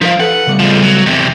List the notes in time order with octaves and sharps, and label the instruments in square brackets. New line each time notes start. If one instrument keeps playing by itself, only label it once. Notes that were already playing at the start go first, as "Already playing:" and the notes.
[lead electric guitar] F3 [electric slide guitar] D#4 A#4 F5
[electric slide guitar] A4 B4 [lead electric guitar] F#5
[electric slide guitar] C#3 G3 A3
[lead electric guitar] F3 G#3
F#3
E2 C3